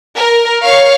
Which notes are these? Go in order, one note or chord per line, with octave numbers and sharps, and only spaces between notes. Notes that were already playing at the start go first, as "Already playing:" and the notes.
A#4
C#5 F5 C#6